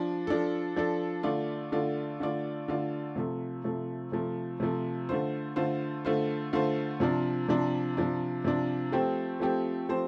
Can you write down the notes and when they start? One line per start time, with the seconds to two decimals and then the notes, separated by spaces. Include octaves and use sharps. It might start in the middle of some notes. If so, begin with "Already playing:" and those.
Already playing: F3 D4
0.27 F3 D4 A4
0.76 F3 D4 A4
1.23 D3 A3 F4 D5
1.72 D3 A3 F4 D5
2.20 D3 A3 F4 D5
2.68 D3 A3 F4 D5
3.16 C3 F3 A3
3.64 C3 F3 A3
4.12 C3 F3 A3
4.60 C3 F3 A3
5.09 D3 A3 F4 C5
5.56 D3 A3 F4 C5
6.05 D3 A3 F4 C5
6.53 D3 A3 F4 C5
7.00 C3 F3 D4
7.49 C3 F3 D4
7.97 C3 F3 D4
8.44 C3 F3 D4
8.92 F3 A3 C4 G4 C5
9.40 F3 A3 C4 G4 C5
9.89 F3 A3 C4 G4 C5